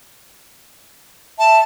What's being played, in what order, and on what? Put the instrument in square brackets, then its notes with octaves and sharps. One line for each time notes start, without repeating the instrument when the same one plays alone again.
[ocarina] E5 [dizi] A5